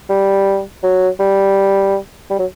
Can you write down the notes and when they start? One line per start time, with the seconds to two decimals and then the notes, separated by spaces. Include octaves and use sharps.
0.09 G3
0.83 F#3
1.20 G3
2.31 G3
2.39 F#3